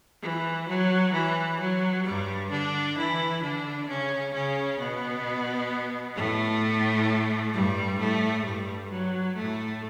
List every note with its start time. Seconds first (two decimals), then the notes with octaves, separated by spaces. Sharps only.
0.22 E3
0.68 F#3
1.13 E3
1.59 F#3
2.05 G2 G3
2.50 D3 D4
2.96 E3 E4
3.42 D3 D4
3.88 C#3 C#4
4.33 C#3 C#4
4.79 B2 B3
6.16 A2 A3
7.53 G2 G3
7.99 A2 A3
8.45 G2 G3
8.91 F#3
9.36 A2 A3